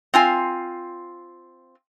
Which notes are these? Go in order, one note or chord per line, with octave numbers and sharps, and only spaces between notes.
C4 F4 G#5